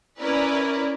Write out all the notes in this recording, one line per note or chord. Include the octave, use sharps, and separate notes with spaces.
C#4 E4 A#4 B4 D5